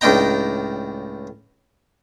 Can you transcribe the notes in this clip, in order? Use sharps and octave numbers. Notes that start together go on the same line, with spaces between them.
C#2 A2 D4 D#4 G5 A#5